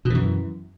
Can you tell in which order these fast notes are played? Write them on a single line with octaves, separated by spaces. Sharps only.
B2 E3 F#2